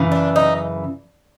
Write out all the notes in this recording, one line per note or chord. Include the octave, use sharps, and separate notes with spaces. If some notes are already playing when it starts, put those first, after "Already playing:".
Already playing: F#2 C#3 E3
D4
D#4